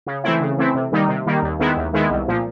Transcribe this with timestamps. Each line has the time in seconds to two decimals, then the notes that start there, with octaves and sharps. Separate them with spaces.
0.06 C#3
0.23 E3 A3 C4 E4
0.41 C#3
0.57 E3 A3 C4 E4
0.75 C3
0.92 D#3 G3 A#3 D#4
1.08 C3
1.26 D#3 G3 A#3 D#4
1.42 D#2
1.60 D#3 G#3 B3 E4
1.77 D#2
1.93 D#3 G#3 B3 E4
2.11 C2
2.28 A#2 F3